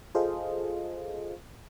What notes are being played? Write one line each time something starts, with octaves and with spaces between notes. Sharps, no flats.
F4 G#4 A4 C5 D#5 F5